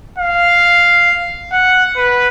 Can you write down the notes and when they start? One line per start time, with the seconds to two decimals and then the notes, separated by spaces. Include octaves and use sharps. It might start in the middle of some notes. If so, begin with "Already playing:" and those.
0.18 F5
1.53 F#5
1.97 B4